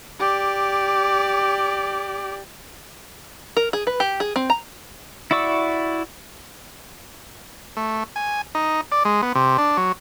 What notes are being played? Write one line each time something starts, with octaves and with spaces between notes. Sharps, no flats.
G4 D5
A#4
G#4
B4
G4
G#4
C4
A#5
E4 F#4 D5 C#6 E6
A3
G#5
D#4
D5
G#3
B3
C3
D4
F#3